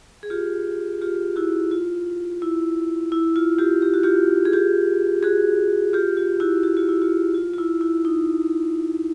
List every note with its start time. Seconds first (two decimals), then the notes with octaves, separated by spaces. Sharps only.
0.23 G#4
0.30 F4 G4
1.02 F4 G4
1.36 E4 F#4
1.71 F4
2.42 E4
3.12 E4
3.36 F4
3.59 F4 G4
3.82 G4
3.94 F#4
4.03 F4 G4
4.45 G#4
4.53 F4 G4
5.23 F#4 G#4
5.93 F4 G4
6.17 F4
6.40 E4 F#4
6.63 F#4
6.77 F4
6.89 E4
7.02 F4
7.35 F4
7.54 F4
7.58 E4
7.81 E4
8.05 D#4